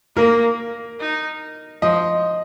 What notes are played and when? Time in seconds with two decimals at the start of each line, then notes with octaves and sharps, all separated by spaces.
0.16 A#3 A#4
1.00 D#4
1.82 F3 D#5